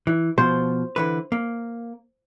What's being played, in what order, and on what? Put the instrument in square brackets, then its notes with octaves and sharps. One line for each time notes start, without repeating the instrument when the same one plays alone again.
[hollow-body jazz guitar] E3
[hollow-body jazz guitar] B2 F3 [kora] C5
[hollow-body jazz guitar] D3 E3 B4
A#3